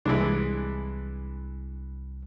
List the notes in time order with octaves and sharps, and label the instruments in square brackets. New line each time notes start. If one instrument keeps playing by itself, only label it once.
[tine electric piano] C2 [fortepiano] E3 G#3 D4